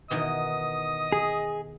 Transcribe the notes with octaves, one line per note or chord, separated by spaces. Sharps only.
B2 D#3 E3 D#5 D#6
G#4